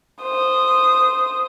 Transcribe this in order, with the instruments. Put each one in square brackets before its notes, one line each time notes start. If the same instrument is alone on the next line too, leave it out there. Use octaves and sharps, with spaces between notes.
[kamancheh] C5 D#6